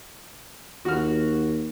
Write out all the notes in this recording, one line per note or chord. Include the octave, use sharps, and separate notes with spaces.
D#2 F#4 F6